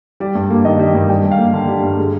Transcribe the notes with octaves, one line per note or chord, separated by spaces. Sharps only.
G3 D5
G2
A#3
D#3 D#5
G3
G2
G3 G5
G2
F5
A#3
D3
G3
G2
G#3